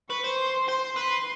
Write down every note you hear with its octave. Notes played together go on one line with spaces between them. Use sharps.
B4 C#6
C5
C6
C5
B4 C6